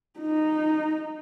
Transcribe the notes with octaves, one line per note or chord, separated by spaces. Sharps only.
D#4